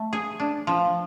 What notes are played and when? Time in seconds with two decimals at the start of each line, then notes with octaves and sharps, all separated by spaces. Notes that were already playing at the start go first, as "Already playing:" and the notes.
Already playing: A3
0.13 G#4
0.40 D4
0.67 F3